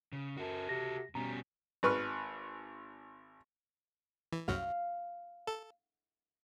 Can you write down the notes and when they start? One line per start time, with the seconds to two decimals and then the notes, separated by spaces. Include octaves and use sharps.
0.13 C#3
0.37 F#2 F#4 A4
0.69 C3 A#6
1.15 B2 G3 C#4 A#5
1.83 G#1 B4 C#6 F6
4.32 E3
4.48 C2 F#2 F#3 F5
5.47 A4